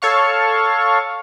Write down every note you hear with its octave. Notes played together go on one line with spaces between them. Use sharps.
A4 C#5 F5 C#6